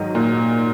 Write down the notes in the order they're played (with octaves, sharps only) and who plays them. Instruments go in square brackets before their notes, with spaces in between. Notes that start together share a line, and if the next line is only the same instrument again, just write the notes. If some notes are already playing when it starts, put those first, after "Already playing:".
Already playing: [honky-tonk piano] G#2 D#3 F#3
[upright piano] A#2